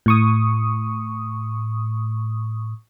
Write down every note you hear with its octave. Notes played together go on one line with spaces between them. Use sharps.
A2 C#6 D#6